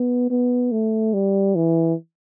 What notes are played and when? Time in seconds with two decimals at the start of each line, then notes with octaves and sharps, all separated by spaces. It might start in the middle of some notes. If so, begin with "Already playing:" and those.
Already playing: B3
0.30 B3
0.71 A3
1.14 G3
1.55 E3